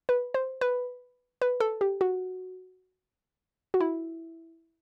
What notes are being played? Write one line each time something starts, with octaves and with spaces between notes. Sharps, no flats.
B4
C5
B4
B4
A4
G4
F#4
F#4
E4